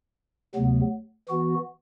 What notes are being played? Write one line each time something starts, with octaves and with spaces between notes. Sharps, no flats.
D2 C3 F#3 B3
E3 B3 F#4